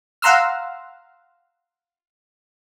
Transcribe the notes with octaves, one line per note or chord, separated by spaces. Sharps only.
F5 F#5 A#5 C6 E6 F6